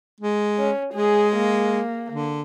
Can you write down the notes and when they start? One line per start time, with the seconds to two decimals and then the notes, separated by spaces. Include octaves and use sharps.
0.21 G#3
0.59 C#4
0.94 G#3 G#4
1.36 A#3
2.10 D3